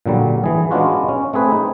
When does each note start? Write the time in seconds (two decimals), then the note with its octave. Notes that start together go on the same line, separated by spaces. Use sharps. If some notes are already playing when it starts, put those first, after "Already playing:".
0.06 A#2 D3 F#3 G3
0.44 E3 G#4
0.71 G#3 B3 C#4 D4 F4 F#4
1.09 C#4
1.33 A3 C4 G#4 B4
1.52 D#4